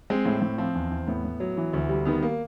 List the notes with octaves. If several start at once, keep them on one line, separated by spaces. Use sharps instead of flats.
G#3 C4
A2
A2
F3 C4
E2
E2
A2 B3
A2
F#3
E3
D2
G3
D#3 B3
A#3